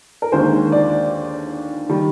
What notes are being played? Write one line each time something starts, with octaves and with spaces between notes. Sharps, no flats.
A#4
D#2 D3 G#3 C5
D5
D#3 G3